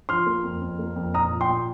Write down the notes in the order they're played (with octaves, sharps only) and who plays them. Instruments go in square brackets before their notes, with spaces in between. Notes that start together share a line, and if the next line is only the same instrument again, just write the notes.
[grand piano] F3 C6 F6
A#3
F2
F2
A#3
F2
A#2 A#5 D#6
F3
G5 C6
A#2